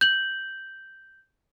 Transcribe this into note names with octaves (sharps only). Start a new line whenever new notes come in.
G6 F#7